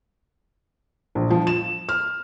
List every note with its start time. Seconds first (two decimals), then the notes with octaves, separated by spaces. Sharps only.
1.15 A#1
1.30 F3
1.47 E7
1.89 F6